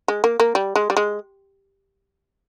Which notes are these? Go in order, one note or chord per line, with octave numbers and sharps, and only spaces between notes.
G#3
A#3
A#3
G3
G#3
G3
G#3